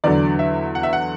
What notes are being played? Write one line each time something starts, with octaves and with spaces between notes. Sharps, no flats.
E2 D3 F#3 D5
E5
F#5
E5
F#5